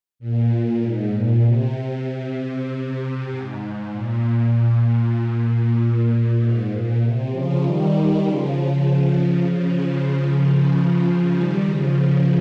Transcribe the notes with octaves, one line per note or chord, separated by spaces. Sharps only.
A#2
G#2
A#2
C3
G#2
A#2
G#2
A#2
C3
C#3 F3
D#3 G3
C#3 F3
C#3 F3
D#3 G3
C#3 F3